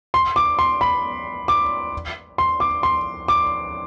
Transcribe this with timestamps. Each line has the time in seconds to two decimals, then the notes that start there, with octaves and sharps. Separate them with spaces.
0.14 C6
0.36 D6
0.59 C6
0.81 B5
1.48 D6
2.38 C6
2.60 D6
2.83 C6
3.28 D6